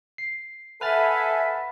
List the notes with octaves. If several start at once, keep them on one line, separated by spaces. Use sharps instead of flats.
C7
A4 B4 E5 F#5 G#5 B5 F6 A6